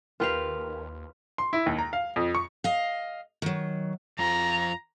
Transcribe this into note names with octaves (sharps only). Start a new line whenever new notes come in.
D#2 F4 G4 A#4 B4 F5
C6
E4
D#2
A#5
F5
F2
C#6
D#5 F5
D#3 F#3
F2 F4 A#5